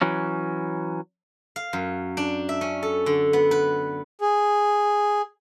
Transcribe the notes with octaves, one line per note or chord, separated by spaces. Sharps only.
E3 F#3 C#4
F5
F#2
D4
E5
C#4
A4
D3
B3
B4
G#4